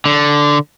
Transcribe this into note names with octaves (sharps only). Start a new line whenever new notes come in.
D3